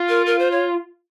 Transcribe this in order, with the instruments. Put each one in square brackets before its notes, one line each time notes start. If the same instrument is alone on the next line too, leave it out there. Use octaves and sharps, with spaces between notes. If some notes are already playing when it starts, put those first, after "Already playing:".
Already playing: [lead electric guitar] F4
[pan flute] A#4
A#4
C5
C#5